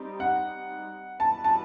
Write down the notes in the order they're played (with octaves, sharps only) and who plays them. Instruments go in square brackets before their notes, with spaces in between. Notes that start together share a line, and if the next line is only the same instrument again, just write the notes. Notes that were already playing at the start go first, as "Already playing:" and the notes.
Already playing: [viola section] G3 C4 D#4 G4
[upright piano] F#5
[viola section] E3 G3 B3 F#4 B4 [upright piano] A5
[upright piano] A5